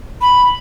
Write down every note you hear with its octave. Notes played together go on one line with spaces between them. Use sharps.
B5